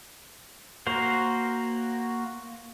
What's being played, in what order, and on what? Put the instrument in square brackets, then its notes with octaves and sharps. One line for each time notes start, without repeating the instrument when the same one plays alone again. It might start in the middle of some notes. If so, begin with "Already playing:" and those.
[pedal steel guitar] A#3 F#4 A#4 C5